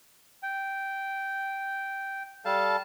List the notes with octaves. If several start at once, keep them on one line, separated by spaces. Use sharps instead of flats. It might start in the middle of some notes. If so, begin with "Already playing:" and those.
G5
G3 A4 F5 A5